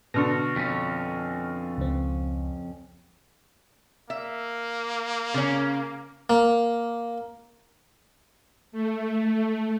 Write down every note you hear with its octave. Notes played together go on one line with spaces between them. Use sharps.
B2 D3 C#6 F6 A#6
F2 C#4
C#2 C4
A#3 E5
C#3 C#4
A#3
A3